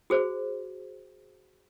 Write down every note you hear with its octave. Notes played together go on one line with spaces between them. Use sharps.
F#4 G#4 C5